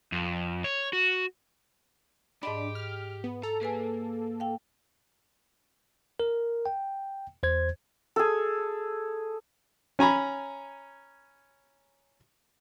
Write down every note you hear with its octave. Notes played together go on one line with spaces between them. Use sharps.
F2
C#5
F#4
G#2 D4 G4 D#5 B5
F6
B3
A4 A#5
A#3 G#4 B4 G#5
F5 G5
A#4
G5
E2 C5 G#6
G#4 A4
C#4 G#5 A#5 B5